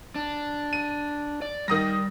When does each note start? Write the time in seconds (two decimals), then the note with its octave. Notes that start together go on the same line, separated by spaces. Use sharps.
0.16 D4
0.73 D#7
1.42 D5
1.68 D#3 G3 D#6 A#6